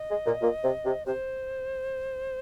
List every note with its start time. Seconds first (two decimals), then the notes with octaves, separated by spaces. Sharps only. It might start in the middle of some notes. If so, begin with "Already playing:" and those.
Already playing: D#5
0.10 G#3
0.26 A#2
0.42 A#2
0.63 C3
0.85 C3
1.06 C3 C5